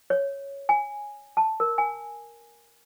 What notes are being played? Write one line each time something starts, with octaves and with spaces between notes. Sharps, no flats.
C#5
G#5
A5
A#4
G#5